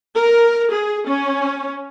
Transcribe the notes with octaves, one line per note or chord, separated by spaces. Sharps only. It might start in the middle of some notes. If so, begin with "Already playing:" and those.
A#4
G#4
C#4